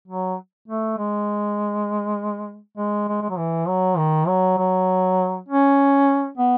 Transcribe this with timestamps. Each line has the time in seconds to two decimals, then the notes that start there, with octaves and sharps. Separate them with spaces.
0.08 F#3
0.68 A3
0.98 G#3
2.77 G#3
3.08 G#3
3.22 G#3
3.30 F#3
3.38 E3
3.68 F#3
3.97 D#3
4.28 F#3
4.58 F#3
5.48 C#4
6.38 B3